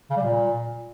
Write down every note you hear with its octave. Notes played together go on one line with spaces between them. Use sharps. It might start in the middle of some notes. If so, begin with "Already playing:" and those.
C#3
G3
A#2